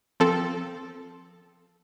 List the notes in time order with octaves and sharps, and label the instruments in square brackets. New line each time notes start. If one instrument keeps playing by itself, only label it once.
[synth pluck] F3 C4 A4